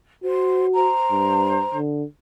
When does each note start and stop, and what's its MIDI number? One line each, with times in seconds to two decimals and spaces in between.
0.24 0.90 66
0.24 0.65 72
0.74 1.77 72
0.74 1.77 82
1.12 1.62 43
1.74 2.04 50